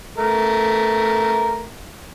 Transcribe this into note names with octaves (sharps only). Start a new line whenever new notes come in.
A3 A#4